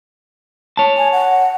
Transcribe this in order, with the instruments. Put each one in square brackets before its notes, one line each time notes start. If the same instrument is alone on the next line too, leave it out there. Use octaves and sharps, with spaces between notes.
[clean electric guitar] C#5 A5
[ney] G#5
F#5